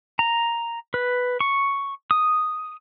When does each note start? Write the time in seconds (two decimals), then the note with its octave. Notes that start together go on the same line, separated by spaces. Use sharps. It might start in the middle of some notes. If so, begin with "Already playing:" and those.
0.19 A#5
0.94 B4
1.41 C#6
2.11 D#6